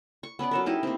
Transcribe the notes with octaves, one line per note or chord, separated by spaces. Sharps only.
C#6
B3 C#4 B4 D5
F#3 A4 A#4
D#4 E4 G4 D#5
A#3 C4